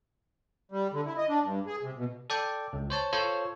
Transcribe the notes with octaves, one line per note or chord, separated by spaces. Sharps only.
G3
D3
E4
D#5
D4
G2
G#4
C3
B2
A4 D5 G5
C#2
C5 C#5 A5
F4 A4 C5 C#5